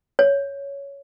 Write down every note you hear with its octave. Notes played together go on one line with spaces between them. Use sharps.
C#5